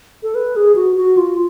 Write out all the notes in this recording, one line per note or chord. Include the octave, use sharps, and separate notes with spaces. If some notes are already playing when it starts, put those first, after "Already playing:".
A4
B4
G#4
F#4
F#4
F4